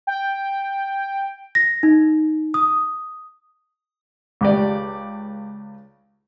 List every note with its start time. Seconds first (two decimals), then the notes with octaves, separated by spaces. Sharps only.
0.07 G5
1.55 A#6
1.83 D#4
2.54 D#6
4.41 C#2 G4 D5